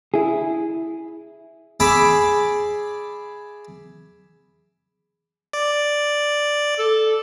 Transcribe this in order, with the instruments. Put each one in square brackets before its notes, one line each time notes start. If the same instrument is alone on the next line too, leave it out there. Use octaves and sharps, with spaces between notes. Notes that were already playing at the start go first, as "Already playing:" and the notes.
[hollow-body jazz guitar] E4 G#4
[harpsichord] G#4 D5 E5 G#5 B5 D6
[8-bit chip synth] D5
[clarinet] A4